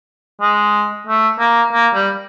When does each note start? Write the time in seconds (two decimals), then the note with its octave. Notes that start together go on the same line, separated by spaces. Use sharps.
0.41 G#3
1.07 A3
1.40 A#3
1.73 A#3
1.94 G3